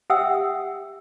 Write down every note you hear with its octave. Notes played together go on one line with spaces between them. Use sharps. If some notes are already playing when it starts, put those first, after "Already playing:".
G4 E5 F#5 G5 D#6 E6